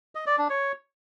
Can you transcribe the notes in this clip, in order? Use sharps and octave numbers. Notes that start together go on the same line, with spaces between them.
D#5
D5
D4
C#5